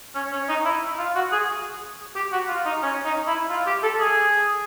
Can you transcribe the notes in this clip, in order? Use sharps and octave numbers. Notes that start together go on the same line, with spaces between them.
C#4
C#4
D#4
E4
F4
F#4
G#4
G4
F#4
F4
D#4
C#4
D#4
E4
F4
G4
A4
G#4